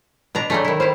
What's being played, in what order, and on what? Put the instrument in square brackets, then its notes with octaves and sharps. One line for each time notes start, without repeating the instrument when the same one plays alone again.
[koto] B2 D4 A#5 [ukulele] B4
[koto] F#3 G3 A3 [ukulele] D4 G#4
[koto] D#3 E4
[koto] G3 E4 [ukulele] C5